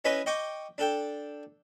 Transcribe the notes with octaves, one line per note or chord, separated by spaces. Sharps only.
C#4 E4 B4 D#5 B5
D#5 G5 C#6 D6
D4 A4 G5